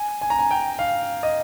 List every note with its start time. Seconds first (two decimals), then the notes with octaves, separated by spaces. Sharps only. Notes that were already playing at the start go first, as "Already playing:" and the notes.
Already playing: G#5
0.21 G#5
0.30 A#5
0.39 G#5
0.51 G5
0.79 F5
1.23 D#5